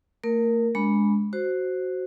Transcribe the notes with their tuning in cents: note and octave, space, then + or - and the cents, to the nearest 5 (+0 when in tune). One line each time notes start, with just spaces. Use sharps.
A3 +45 A#4 +0
G#3 +0 D4 -25 B5 -10
F#4 +5 C5 +0